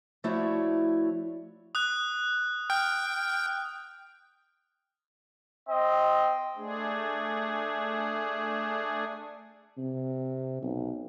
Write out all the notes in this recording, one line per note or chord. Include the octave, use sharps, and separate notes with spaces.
F3 A3 E4 F#4 C#5 D5
D#6 F#6
G5 F6
C4 D#5
A3 D4 G#4
C3
B1